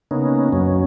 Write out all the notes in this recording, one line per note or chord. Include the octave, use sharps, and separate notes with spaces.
C#3 A#3 B3 C#4 D#4
F#2 F#3 C#4